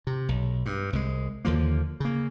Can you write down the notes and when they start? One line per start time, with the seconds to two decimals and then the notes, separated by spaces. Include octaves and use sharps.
0.07 C3
0.29 B1
0.66 G2
0.93 C2 G#3
1.45 D#2 D3 F3 A#3
2.00 C#3 A#3